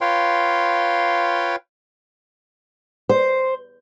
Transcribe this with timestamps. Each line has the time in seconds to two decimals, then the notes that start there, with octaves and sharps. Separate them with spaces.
0.01 F4 B4 C#5 F5 G5 C6
3.09 C5